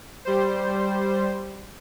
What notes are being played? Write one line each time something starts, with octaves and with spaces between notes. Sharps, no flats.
G3 C5